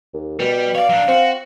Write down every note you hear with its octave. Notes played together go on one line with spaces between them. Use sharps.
D#2
B2 G3
C#5 D5 F5
F#3 D4
C4 F#4